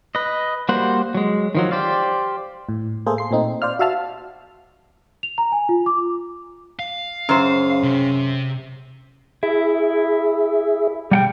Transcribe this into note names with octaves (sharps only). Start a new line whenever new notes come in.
B4 D#5
G3 A#3 F#4 C5 F#5
F#3 G#3
D#3 F3 F#3
G4 C5 D5 F5
A2
A3 A#3 G#4 A4 C5
C6 C7
A#2 A3 C4 D#4
C5 D5 F5 F6
F#4 E5 F5 A5 F6
F7
A#5
G#5
F4
D6
F5
F#2 C#3 C5
C3
E4 G#4 E5
B2 G3 F#5 G5